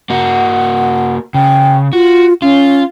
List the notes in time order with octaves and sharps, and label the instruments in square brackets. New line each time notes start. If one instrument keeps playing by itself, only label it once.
[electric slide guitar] A#3 F#4 [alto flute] F#5
[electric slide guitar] C#3 [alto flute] G5
[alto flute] F4 [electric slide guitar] F#4
[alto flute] C#4 [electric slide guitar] F4